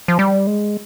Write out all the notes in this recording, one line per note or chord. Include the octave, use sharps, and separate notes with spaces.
F3
G3
G#3